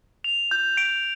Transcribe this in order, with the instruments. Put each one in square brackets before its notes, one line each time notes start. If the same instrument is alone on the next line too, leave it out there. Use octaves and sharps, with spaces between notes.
[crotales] F7
G6
D7